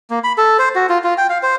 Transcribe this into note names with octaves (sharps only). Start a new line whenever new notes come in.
A#3
B5
A4
C5
F#4
F4
F4
G5
F5
C5